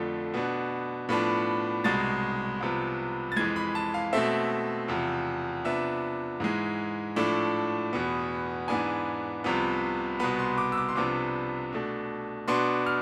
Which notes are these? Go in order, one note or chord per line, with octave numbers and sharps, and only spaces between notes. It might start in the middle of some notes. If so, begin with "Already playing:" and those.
Already playing: F2 D3 F3 A3
B2 B3 D4
A2 F3 B3 D4
C2 B2 G#3 A6
C2 C3 F3 B3
A6
F2 E3 G#3 G#6
B5
A5
F5
B2 A3 C4 E5
E2 C3 F3
C3 F3 B3 D4 E5
G#2 E3 G#3
A2 F3 A3 D4
E2 B2 B3
G#2 E3 B3 D4 G#5
C2 C3 F3 B3
C2 B2 B3 B5
C6
D6
E6
D6
C6
C2 C3 F3 B3 D4 D6
B2 A3 D4
B2 B3 D4 C6
F6